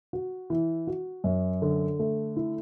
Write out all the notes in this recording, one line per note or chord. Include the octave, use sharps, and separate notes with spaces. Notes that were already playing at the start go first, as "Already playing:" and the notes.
F#4
E3
F#4
F#2
D3
A3
E4